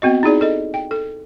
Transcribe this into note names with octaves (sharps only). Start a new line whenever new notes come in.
B3 C4 F#4 D#5
D#4 E4 G#4 D5
A4 D#5
G5
A4